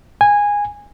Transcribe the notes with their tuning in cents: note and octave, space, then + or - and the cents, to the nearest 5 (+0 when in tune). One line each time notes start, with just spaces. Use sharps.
G#5 -15